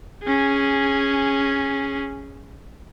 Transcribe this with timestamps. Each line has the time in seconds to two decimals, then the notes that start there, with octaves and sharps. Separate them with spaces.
0.23 C#4 G#4